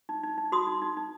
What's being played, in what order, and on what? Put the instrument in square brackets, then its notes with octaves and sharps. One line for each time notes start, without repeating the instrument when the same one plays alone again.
[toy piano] D#4
D#4
D#4
F#4 C6 D#6
D#4
D#4
D#4